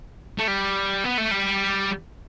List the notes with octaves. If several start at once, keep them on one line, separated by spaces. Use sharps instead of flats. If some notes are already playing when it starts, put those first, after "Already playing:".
A3
G3
B3
A3
G3